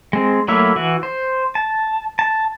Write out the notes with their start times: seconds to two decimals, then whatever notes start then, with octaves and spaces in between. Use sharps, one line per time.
0.13 G#3 C4
0.48 F#3 A3 A#3 E4 E5
0.76 E3 F#4
1.03 C5
1.55 A5
2.19 A5